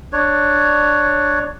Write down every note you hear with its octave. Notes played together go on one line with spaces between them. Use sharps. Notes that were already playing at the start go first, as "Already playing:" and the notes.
D4 C#5